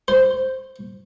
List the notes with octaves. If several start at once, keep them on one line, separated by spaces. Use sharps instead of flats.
C5